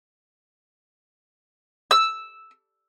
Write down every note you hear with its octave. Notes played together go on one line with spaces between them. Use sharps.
E6